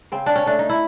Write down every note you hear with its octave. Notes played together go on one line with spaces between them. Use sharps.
C#3 C4
D4
C#4
A3 D4
D#4
E4